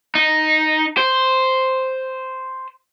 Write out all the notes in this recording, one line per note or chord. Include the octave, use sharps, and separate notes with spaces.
D#4
C5